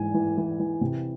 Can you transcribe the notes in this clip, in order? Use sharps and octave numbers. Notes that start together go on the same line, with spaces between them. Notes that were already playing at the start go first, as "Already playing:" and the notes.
Already playing: G#2 E3 G#5
E3
E3
E3
C3